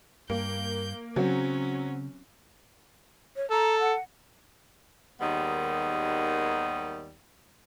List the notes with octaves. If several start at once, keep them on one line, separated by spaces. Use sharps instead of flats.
G2 A#3 G6
C#3 F#3 C4 C#4 F#4
C#5
A4 A#5
F#5
D#2 D#3 G3 G#3 B3 D#4